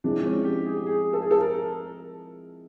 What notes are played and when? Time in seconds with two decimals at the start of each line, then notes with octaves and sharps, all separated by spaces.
0.04 F3 G#3 C4 D4 E4
0.25 C#4
0.44 G4
0.66 G#4
0.76 G4
0.87 G#4
1.13 A4
1.22 G#4
1.31 A4
1.41 A#4